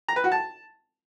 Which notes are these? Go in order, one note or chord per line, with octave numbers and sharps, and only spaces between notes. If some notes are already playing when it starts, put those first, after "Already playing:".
A#5
B4
F#4
A5